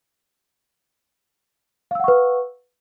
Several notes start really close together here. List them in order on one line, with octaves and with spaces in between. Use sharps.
F5 E6 F#5 C#6 B4